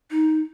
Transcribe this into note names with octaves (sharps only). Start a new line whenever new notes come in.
D#4